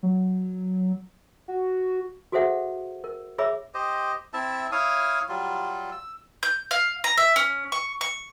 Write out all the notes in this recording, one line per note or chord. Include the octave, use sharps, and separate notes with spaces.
F#3
F#4
F#4 G#4 A4 C5 E5 F#5
A#4
G#4 C#5 E5 B5 D6 E6
G4 C5 D#5
C4 E4 E5 A5
E4 C#5 F5 D#6
F#3 G3 F4
E6
G6
F5
A#5
E5
C#4
C#6
C#6